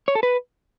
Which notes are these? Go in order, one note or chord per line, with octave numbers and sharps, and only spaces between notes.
C#5
A4
B4